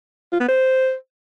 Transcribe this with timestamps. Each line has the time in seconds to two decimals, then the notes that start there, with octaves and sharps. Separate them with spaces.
0.32 F4
0.40 B3
0.48 C5